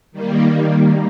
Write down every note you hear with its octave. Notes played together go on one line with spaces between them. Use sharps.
D#3 G3 A#3